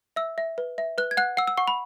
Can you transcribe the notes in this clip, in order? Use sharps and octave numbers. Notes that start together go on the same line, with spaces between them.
E5 E6
E5
B4
E5
B4 F#6
G#6
F#5 F#6
F#5 E6
E6
F#5 C#6
B5